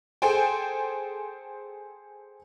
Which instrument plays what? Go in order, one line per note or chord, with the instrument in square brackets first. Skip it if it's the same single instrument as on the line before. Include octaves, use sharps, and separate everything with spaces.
[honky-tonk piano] G#4 A4 C5 G5 G#5